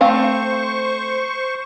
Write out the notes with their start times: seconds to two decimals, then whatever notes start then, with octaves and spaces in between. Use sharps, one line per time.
0.01 A3 C4 C5 F5 C#6